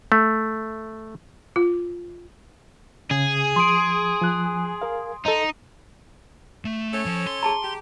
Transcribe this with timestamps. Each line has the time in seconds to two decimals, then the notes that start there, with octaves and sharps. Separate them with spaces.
0.12 A3
1.56 F4
3.11 C#3 G#4
3.56 F3 C6 D#6 D7
4.22 F3 F#6
4.82 A#4 F5
5.26 D#4 A4 D#5
6.65 A3
6.93 C#4 A4 C#5
7.06 F3
7.27 C6
7.43 G#4 A5 A#5
7.62 G4